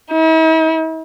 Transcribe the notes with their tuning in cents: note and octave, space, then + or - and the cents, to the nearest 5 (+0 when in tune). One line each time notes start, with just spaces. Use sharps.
E4 -45